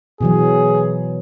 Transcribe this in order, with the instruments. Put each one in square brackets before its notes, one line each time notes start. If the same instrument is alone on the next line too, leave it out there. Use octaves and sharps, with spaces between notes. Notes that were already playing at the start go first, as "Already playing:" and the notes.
[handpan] B2 E3 F#3 [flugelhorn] G#4